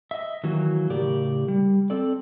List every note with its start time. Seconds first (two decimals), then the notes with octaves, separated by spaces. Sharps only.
0.11 D#5 E5
0.43 D#3 E3 F#3 A#3 F#4
0.90 A2 C#3 G4 A#4 D5
1.48 G3
1.90 C4 A4 D5